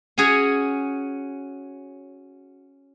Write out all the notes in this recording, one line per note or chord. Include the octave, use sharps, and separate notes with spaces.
C#4 F#4 G#4 C#5